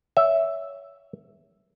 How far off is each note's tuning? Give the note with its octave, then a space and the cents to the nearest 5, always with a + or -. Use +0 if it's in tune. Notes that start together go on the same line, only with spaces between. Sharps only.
C#5 +20 E5 +0